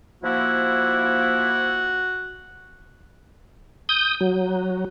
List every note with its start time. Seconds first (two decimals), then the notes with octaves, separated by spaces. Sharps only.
0.24 F3 A#3 E4 F#4
3.89 D#6 G6
4.20 F#3